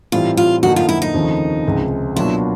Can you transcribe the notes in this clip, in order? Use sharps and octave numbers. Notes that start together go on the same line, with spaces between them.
A2 E3 G3 C4 F4
F4
F2 D3 F3 A#3 D#4 F#4
F4
E4
D#4
D#2 C#3 F3 A3 C4
C#2 C3 F3 G#3
B2 F#3 A#3 D4 E4 F4